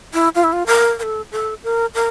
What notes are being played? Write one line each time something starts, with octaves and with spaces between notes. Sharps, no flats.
E4
F4
E4
F4
A#4
A#4
A4
A4
A#4
A#4